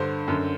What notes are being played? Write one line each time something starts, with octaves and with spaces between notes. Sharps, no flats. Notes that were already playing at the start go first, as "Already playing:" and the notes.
Already playing: G2 D3 C5
F#2 D3